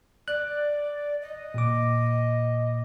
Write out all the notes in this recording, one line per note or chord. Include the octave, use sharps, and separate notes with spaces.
D5 F#6
D#5
A#2 D6